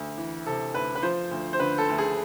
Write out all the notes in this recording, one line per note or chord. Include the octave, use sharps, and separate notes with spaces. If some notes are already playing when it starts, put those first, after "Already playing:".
Already playing: D2
E3
C3 A4
D2 B4
B4
F3 C5
D2
C5
D3 B4
A4
D2
G#4